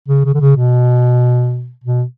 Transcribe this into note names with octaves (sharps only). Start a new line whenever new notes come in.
C#3
C#3
D3
C#3
B2
B2